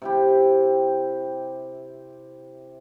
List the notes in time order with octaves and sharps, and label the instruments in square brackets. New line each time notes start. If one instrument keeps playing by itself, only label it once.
[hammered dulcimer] C3 E4 G4